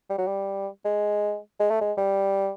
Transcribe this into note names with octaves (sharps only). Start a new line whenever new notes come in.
G3
F#3
G3
G#3
G#3
A3
G#3
G3